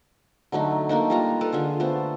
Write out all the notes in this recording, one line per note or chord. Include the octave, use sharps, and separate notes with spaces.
D3 F#3 A3 D#4
A3 A#3 D4 D#4
G3 F4 A#5
A4 B4 F5
D3 F4 G#4
A3 B3 A4 C5